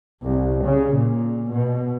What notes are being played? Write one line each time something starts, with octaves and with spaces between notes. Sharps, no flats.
C2
C#3
A#2
B2